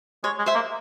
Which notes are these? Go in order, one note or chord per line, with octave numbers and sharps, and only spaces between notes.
G#3 C#5
G#3
C5 E5
A#3